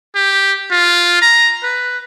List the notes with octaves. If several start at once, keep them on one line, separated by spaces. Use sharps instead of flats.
G4
F4
A#5
B4